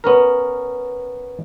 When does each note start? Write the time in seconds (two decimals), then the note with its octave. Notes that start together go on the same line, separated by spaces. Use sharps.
0.04 B3 C#4 A#4